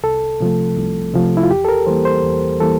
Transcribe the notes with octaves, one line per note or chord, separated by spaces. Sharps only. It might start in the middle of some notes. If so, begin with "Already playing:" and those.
C2 A4
C3 F3 A3
C2
C3 F3 A3
E4
F4
E2 G4
A4
A#4
E3 G3 A#3 C5
C5
E2
E3 G3 A#3 A4